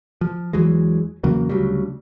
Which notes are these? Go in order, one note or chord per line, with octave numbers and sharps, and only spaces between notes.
F3
E2 E3 F#3 G#3
E2 C#3 F#3 A#3
D2 C#3 F#3 G3